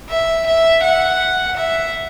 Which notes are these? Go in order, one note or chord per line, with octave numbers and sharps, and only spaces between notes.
E5
E5
F#5
E5